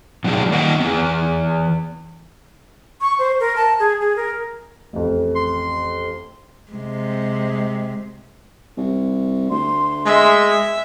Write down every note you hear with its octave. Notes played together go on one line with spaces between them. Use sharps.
B2 F3 F#3 G#3 D4
D#3 A#3 D#5 E5 F#5
E3 B3
C#6
C5
A#4
A5
G#4
G#4
A#4
A1 F2
C6
C3 G#3
C2
D2 C6
G#3 E5